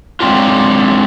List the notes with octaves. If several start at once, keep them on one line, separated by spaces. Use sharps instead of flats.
F#3 G#3 C4 D4 F4